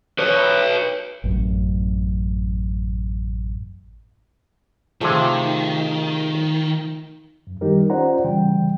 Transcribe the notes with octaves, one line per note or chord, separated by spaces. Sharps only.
B4 C#5
A1 F#2
C3 D#3 F3 A3 G#4 A5
F#2
D#3 G3 D#4 G4 A#4
C#4 F4 C5 D5 F#5 A#5
C#3 E3 G3 G5